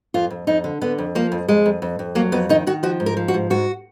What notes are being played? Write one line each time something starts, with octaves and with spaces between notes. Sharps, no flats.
F2 F4
F2
F2 D#4
D3
D3 B3
F2
F3 A#3
F2
F2 G#3
F2
F2
F2
F#3 A#3
F2 B3
D#3 D#4
D#3 F#4
F3 F#4
G#2
A#4
F3
F#4
G#2
G#2 F#4